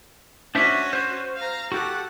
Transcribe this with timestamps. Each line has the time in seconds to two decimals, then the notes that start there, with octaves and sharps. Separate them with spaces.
0.55 C#4 D4 F#4 C5 E5
0.93 C5
1.36 F5 A#5
1.72 F#4 G4 A4 F#5